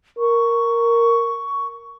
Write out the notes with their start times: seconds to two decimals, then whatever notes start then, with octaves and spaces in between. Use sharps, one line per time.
0.19 A#4 C#6